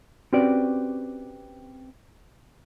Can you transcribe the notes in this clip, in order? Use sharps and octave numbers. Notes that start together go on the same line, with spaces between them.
C4 C#4 F#4 G4 B4 D5